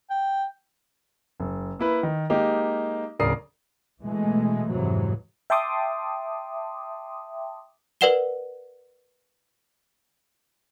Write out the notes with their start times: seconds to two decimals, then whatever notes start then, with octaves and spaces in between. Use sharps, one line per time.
0.10 G5
1.40 F#1
1.79 A#3 E4 B4
2.03 D#3
2.30 G#3 A#3 D#4 G4
3.19 D1 C#3 A#4 D5 D#6 C7
4.03 B2 E3 G#3 A3
4.70 F2 G#2 C3 E3 F#3
5.50 E5 G5 A5 C6 D6 D#6
8.01 A#4 B4 D5 F#5 E7 G7